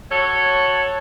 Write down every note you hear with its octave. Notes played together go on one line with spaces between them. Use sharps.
F#4 A4 C#5